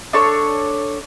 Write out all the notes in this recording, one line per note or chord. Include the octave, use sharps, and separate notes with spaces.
D4 A4 C#5